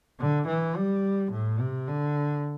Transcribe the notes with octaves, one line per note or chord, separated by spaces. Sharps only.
D3
E3
G3
A2
C3
D3